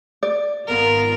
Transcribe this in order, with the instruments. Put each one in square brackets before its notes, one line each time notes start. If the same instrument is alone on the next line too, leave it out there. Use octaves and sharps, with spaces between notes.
[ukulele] D5
[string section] G#1 B3 F4 [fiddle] A#4